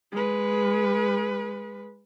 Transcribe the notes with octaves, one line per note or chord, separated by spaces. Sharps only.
G#3 B4